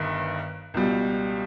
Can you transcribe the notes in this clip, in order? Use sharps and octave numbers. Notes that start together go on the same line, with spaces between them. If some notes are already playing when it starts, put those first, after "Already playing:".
Already playing: G1 G2 D#3
C#2 B2 G3